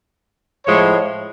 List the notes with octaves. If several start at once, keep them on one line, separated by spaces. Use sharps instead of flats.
A2 F3 G#3 C#5